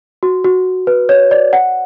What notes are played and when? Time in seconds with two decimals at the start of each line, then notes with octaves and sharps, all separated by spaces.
0.23 F#4
0.44 F#4
0.87 B4
1.09 C#5
1.31 D5
1.53 F#5